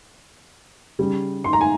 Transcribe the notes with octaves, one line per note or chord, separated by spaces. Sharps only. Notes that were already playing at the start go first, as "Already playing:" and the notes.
C#3 G3
C6
A#5
G#5